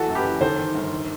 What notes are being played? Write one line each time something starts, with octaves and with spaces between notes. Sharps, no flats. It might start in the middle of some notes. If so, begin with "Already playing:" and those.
Already playing: E3 F#4 A4
F#2
G4 B4
E3
D#3 A4 C5
D#3
G1
D#3